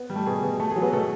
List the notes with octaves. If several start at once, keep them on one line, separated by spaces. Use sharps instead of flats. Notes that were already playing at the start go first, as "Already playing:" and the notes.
Already playing: B3
G3
A3 A4
B2 G#4
B2
A3 A4
G#4
F#3
B3 B4
B2 A3 A4